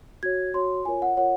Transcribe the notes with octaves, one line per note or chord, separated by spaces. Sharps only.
F#4 C#5 G#6
F#4 C#5 C6
F4 A#4 C#5 G#5
F#5
F4 A#4 C#5 F#5